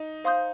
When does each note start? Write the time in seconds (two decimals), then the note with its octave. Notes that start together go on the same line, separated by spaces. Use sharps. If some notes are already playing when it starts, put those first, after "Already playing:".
Already playing: D#4
0.24 C5 F5 C6 D#6 G6